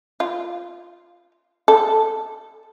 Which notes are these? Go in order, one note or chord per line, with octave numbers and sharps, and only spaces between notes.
F4
A4